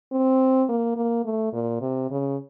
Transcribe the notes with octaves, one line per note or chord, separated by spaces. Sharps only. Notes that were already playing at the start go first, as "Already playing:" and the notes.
C4
A#3
A#3
A3
A#2
C3
C#3